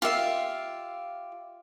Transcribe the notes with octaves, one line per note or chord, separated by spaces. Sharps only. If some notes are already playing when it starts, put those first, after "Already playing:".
F4 G4 E5 F5